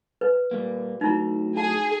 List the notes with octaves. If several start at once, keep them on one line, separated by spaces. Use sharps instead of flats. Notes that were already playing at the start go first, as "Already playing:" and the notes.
B4
A#2 G3 A#3
A2 F#3 D#4 E4
G#4 A5